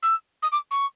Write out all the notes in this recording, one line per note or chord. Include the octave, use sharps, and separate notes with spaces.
E6
D#6
D6
C#6